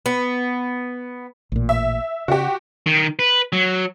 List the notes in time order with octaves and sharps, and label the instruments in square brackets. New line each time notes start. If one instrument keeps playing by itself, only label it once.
[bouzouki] B3
[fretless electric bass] A1 A#2
[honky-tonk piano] E5
[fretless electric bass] C#3 [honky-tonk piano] F#4 G4
[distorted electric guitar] D#3
B4
F#3